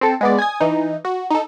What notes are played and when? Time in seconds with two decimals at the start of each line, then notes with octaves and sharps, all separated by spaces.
0.01 C4 A4
0.21 G#3 B3 D5
0.38 G#5 D#6 G#6
0.60 E3 D#4
1.05 F#4
1.30 D#4 A4